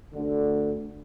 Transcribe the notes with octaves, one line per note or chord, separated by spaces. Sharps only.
D2 D3